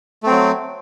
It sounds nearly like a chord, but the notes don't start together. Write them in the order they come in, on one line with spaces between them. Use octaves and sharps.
A3 C4 F#3